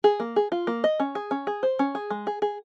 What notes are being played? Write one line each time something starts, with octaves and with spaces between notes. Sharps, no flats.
G#4
A#3
G#4
F4
A#3
D#5
C#4
G#4
C#4
G#4
C5
C#4
G#4
G#3
G#4
G#4